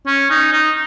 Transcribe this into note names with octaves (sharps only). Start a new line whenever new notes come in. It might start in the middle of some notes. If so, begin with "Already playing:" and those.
C#4
D#4
D#4